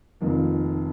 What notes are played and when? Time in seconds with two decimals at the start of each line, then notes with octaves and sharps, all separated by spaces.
0.20 F1 F2 D#3 A#3